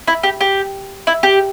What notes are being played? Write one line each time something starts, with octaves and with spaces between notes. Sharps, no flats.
E4
G4
G4
E4
G4